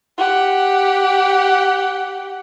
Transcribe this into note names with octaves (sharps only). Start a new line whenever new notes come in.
G4 F#5